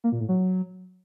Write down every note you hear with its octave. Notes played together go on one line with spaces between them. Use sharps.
A#3
A#2
A2
F#3